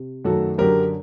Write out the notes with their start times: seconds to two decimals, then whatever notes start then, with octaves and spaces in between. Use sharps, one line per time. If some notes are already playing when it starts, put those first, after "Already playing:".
Already playing: C3
0.25 F#2 D#3 F#3 A3 F#4 A4
0.58 F#2 D3 F#3 G4 A#4